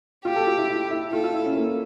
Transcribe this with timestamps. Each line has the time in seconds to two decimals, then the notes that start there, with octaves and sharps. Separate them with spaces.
0.25 F4 G4
0.36 A4
0.47 F4
0.58 E4
0.69 E4
0.91 E4
1.12 F4 A4
1.24 F4
1.34 E4
1.46 C#4
1.56 A#3